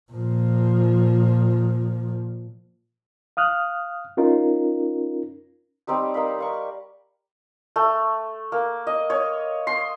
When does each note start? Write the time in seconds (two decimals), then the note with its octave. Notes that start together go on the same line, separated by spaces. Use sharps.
0.12 A#2 F3
3.37 F5 D#6 F6 F#6
4.17 C#4 D#4 F4 A#4
5.87 G3 C4 D#4 G4
6.14 D#4 A#4 F5 B5
6.39 D5 F5 C#6
7.76 A3
8.52 A#3
8.87 D#5
9.10 C#5
9.67 C6